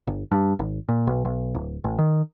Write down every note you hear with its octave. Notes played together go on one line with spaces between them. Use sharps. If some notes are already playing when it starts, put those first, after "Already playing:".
G1
G2
G#1
A#2
B1
B1
D1
A1
D#3